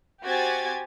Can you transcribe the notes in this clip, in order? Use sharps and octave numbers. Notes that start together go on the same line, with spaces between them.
C4 F#4 G4 G#5 G#6 A6